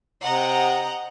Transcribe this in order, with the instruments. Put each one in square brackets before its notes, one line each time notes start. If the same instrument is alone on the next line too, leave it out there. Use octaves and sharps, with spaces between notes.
[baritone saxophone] C3 [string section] D#5 F#5 A#5